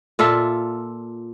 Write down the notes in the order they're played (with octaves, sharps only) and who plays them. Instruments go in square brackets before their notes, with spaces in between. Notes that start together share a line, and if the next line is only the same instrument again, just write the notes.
[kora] A#2 F4 A4 E5